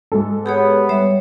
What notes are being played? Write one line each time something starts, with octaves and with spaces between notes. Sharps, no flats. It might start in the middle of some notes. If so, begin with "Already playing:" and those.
G#2 A4
B3 G4 G#4 C#5
G3 C#5 E5